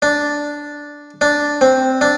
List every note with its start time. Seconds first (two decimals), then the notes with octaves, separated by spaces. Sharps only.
0.02 D4
1.21 D4
1.61 C4
2.01 D4